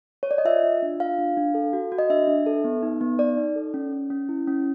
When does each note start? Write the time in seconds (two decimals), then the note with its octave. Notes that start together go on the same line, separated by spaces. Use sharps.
0.23 C#5
0.31 D5
0.38 D#5
0.45 F4 E5
0.63 F4
0.82 D4
1.00 F4 F5
1.18 D4
1.37 D4
1.54 A4
1.73 F#4
1.92 F#4
1.99 D#5
2.10 D4 E5
2.27 D4
2.46 A4
2.64 B3
2.83 D#4
3.01 B3
3.19 D#4 D5
3.37 D#4
3.56 A4
3.74 C#4
3.93 C#4
4.10 C#4
4.29 E4
4.48 C#4